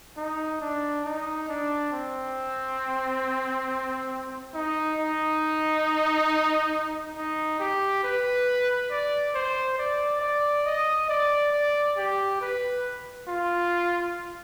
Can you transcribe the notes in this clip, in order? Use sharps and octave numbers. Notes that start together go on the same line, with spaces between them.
D#4
D4
D#4
D4
C4
D#4
D#4
D#4
G4
B4
D5
C5
D5
D5
D#5
D5
D5
G4
B4
F4